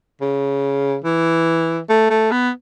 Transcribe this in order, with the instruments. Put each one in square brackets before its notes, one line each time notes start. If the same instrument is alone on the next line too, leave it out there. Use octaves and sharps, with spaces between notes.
[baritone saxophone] C#3
E3
A3
A3
B3